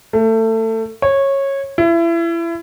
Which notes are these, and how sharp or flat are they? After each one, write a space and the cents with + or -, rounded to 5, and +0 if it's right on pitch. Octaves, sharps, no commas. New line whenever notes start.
A3 +25
C#5 -15
E4 +30